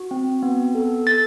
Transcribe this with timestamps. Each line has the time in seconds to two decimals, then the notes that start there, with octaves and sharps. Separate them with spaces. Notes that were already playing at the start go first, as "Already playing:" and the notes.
Already playing: F#4
0.11 C4
0.43 B3
0.75 A4
1.07 A4 A6